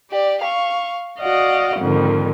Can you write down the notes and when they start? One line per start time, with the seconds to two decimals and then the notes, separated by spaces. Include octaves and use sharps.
0.11 G4 D5
0.42 F5 C#6
1.20 F#4 D5 D#5 F5 F#5
1.79 F2 G#2 D3 D#3